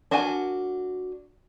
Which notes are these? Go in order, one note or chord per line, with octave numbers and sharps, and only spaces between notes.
D4 F#4 A#4 F#5 G#5